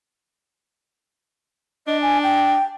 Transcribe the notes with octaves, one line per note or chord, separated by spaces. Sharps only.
D4 D#5
G#5
G5